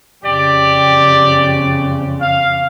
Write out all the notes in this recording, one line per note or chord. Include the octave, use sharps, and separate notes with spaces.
F2 C#3 G4 D5
F5